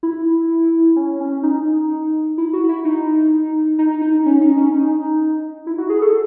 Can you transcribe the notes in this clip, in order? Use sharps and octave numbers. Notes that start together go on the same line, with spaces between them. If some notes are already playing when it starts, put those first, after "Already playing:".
E4
C#4
C#4
D#4
E4
F#4
E4
D#4
D#4
D#4
C#4
D#4
C#4
D#4
E4
F#4
G#4
A4